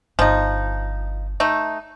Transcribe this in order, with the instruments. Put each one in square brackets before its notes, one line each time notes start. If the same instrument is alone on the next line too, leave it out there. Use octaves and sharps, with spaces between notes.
[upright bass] G1 [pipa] F3 D#4
[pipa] A3 D#4